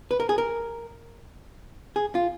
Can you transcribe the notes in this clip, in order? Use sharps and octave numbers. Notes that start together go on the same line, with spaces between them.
B4
A#4
G#4
A#4
G#4
F4